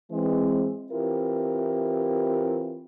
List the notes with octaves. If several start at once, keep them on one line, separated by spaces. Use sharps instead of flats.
E3 G#3 C4
E3 C4 E4 F4 G4 A#4